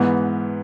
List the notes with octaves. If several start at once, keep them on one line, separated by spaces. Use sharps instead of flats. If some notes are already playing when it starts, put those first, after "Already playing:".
Already playing: G#2 E3 B3